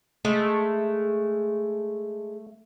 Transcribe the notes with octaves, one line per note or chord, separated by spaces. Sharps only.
G#3 A3